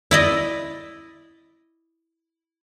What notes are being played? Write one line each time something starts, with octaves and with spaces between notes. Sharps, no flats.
E4 D5 D#5